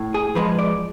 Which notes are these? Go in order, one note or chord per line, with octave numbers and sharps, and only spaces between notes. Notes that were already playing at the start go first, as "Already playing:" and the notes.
Already playing: A2
G#4
F3 G#3 B4
D5